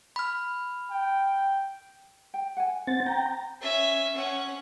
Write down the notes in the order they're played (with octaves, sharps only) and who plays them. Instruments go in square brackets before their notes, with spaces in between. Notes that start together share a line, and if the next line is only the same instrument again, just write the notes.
[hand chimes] B5 F6
[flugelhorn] G5
[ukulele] G5
F#5 G#5
[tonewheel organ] C4 A6 [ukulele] C5 F#5
[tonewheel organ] G5 A#5
[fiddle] C#4 E5
C#4 F#5